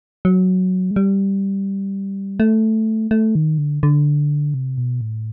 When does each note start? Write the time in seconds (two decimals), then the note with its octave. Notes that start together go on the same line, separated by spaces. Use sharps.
0.25 F#3
0.91 G#3
0.96 G3
2.40 A3
3.11 A3
3.35 D#3
3.58 D3
3.83 D3
4.54 C3
4.78 B2
5.01 A2